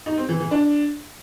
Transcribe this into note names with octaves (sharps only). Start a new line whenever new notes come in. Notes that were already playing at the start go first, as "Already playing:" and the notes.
D#4
C4
E3
E3
D4